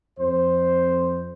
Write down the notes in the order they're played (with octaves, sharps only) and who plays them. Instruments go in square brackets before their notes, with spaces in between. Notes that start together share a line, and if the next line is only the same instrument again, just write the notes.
[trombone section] F2 C5